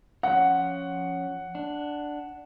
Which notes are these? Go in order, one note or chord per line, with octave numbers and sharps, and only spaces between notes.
F3 C#4 F4 F#5
D4